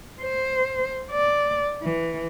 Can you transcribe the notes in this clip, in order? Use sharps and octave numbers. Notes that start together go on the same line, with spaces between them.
C5
D5
E3